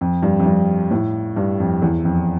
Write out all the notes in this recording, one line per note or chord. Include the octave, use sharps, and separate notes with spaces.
F2
G2
F2
G2
A2
G2
F2
E2
F2